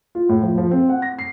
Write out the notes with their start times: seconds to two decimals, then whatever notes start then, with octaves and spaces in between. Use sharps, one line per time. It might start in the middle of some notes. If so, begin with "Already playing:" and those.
0.15 F4
0.29 A2
0.43 F3
0.58 F3
0.71 C4
0.89 F#5
1.02 A#6
1.19 C7